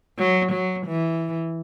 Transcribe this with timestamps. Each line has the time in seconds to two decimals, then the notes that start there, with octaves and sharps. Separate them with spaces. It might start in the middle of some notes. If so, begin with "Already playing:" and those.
0.18 F#3
0.52 F#3
0.87 E3